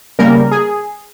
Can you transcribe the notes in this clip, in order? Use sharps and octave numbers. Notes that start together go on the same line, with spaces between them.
C#3 G3 A#3 A#4
G#4